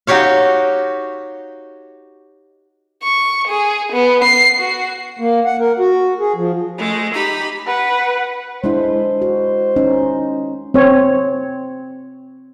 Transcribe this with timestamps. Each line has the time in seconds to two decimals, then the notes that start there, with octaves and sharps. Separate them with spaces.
0.07 D#4 F#4 G4 C#5 F5
3.03 C#6
3.47 G#4
3.92 B3
4.24 C7
4.59 F#4
5.19 A#3
5.45 F#5
5.60 A#4
5.79 F#4
6.20 G#4
6.35 F3
6.77 G#3 A3
7.13 D#4 G4 B5
7.67 B4 F#5
8.64 G#3 D4 E4 C5
9.22 F#4
9.76 C#4 D#4
10.74 C4 C#5